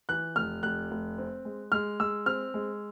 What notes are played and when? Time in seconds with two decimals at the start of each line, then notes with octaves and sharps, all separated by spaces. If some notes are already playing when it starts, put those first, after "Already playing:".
0.09 E3 F#6
0.36 F1 F6
0.63 F1 F#6
0.91 F1
1.18 C4
1.45 G#3
1.72 G#3 F6
2.00 G#3 E6
2.26 C4 F6
2.54 G#3